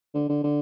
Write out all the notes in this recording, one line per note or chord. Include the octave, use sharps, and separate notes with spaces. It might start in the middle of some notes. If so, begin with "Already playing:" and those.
D3
D3
D3